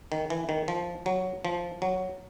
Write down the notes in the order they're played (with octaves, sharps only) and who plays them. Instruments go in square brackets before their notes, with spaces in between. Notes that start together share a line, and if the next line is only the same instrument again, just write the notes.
[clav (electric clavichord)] D#3
E3
D#3
F3
F#3
F3
F#3